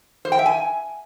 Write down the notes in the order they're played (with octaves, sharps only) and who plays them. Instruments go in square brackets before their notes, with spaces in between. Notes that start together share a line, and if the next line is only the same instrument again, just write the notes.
[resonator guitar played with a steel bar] C5
G5
E5
G#5